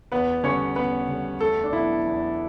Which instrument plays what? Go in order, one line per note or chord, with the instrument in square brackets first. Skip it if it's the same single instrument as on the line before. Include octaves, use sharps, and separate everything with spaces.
[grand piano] E2 B3 B4
D3 G3 C#4 C#5
E2 B3 B4
D3 G3
E2 A3 A4
D4
B2 F#3 E4
E2